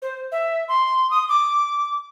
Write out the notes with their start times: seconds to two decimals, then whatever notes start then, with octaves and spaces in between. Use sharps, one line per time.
0.02 C5
0.32 E5
0.68 C6
1.11 D#6
1.29 D6